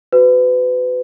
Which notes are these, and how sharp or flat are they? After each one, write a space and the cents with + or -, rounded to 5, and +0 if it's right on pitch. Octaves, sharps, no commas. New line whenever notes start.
F#4 +0 B4 +30